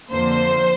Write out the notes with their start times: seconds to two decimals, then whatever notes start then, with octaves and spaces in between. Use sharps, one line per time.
0.12 F2 D3 F3 A#3 C5